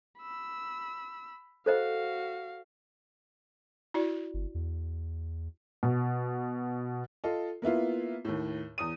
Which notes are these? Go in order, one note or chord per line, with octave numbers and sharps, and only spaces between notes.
B5 E6
F#4 A4 C5 D#5 F5
E4 F#4 D5
G1
E2
B2
F4 A4 D#5
A#3 B3 E4 F4
D#2 A2
E2 D#6 D#7